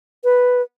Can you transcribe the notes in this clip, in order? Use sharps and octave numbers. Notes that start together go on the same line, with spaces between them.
B4